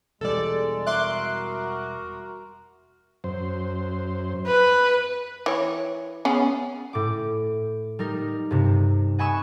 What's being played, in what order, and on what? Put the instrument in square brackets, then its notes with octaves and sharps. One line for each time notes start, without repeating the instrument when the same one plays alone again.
[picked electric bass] E1 E2 G3 [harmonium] G#3 [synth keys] A4 D5
[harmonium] F#4 A#4 [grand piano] E5 [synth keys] C6 D6 F#6
[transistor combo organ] F#2 C5
[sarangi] B4
[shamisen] E3 C#5
B3 C#4 G#4
[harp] A2 D6
G3 D#4 A#4
G2 C3
D#5 F#5 G#5 B5 C#6 E6